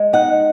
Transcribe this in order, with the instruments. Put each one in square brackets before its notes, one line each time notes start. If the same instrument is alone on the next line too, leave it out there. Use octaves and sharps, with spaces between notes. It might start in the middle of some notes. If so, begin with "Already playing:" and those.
Already playing: [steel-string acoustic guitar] G#3
D#4 F#5